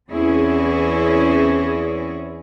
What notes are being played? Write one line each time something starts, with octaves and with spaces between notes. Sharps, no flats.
E2 C4 C#4 E4 G#4